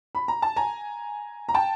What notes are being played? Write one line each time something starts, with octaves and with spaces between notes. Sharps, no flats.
B5
A#5
A5
G#5 A#5
A#5
G5 A5